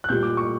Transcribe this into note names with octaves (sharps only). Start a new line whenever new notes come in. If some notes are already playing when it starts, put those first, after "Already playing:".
F#6
A#2 G3 G6
D6
C#6